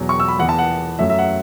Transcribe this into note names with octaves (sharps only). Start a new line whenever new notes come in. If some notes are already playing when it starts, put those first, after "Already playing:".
Already playing: E2 B2 F#3
C#6
E6
B5
E2 E3 B3 F#5
A5
F#5
F#2 F#3 A3 E5
E5
F#5